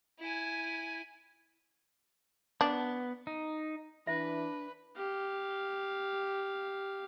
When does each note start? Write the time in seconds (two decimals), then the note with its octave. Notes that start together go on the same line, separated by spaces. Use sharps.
0.20 E4 G#5
2.61 B3 D4
3.27 D#4
4.07 E3 D4 B4 E5
4.95 G4 F5